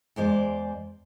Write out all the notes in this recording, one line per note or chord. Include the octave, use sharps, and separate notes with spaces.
E2 G#3 C5 D5